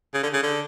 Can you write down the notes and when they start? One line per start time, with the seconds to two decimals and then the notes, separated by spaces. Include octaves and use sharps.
0.14 C#3
0.23 D3
0.33 C#3
0.43 D3